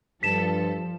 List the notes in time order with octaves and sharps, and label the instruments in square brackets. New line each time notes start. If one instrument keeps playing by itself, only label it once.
[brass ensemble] G2 [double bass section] F3 [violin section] A4 [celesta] B6 E7